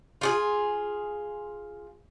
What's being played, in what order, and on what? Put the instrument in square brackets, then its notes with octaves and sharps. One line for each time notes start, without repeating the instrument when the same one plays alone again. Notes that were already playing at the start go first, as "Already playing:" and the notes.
[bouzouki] F4 G4 G#4